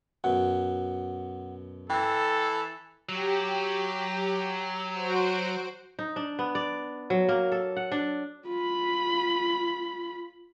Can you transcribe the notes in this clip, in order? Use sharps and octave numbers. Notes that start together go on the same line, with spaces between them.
F#2 B2 F#5
E3 A4 G5
F#3 G4
F#4 C5 D7
D#4
D4
B3
D5
F#3
A#3
A4
F#5
D4
F4 B5